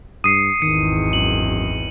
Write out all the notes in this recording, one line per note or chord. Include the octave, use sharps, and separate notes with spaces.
G2 D#6 C7 C#7 D#7
G#1 E2 D#3 C#7
F#2 F#7